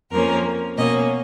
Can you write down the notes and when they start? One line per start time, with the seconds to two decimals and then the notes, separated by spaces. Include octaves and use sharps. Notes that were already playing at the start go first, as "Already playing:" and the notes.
0.11 F2 F3 A#3 C#4 A#4
0.77 B2 A#3 C#4 D#5